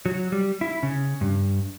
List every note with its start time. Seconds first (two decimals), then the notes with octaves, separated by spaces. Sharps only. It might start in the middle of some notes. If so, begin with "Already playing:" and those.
0.06 F#3
0.32 G3
0.61 E4
0.83 C#3
1.21 G2